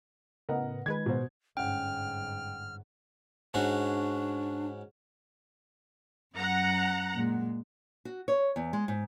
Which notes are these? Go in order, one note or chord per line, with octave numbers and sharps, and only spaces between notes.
A2 C#3 B3 A#4 D#5 F#5
D#3 G#3 B4 G#6
B2 C5
G1 G#2 C#4 F#5 G5 F6
G#2 C#4 D4 F#4
F#2 F#5 A#5
A#2 G#3
F#4
C#5
E2
G#3
G#2